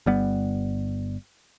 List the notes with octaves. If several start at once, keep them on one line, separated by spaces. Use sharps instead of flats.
G1 G3 B3